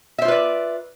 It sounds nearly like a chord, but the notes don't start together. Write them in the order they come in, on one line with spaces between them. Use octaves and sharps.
E5 C5 F4 B4 D5